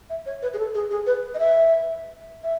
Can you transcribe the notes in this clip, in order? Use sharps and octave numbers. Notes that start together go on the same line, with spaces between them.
E5
C#5
B4
G#4
A4
G#4
G#4
B4
D#5
E5
E5